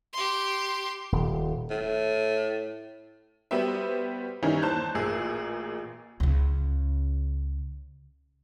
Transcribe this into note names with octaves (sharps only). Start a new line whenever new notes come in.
G4 C6
D#1
A2
G3 B3 F#4 G4 C5 E5
D#3 E3 G3 C#4 D#4 E4
D#2 C5 A5 F#6 G6
A1 A#2 G#4 E6
C#2 C#3